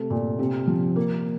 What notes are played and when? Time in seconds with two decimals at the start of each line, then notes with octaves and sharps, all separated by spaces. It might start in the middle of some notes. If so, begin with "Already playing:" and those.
Already playing: C3 A3
0.10 A#2
0.39 C3
0.67 F3
0.96 A#3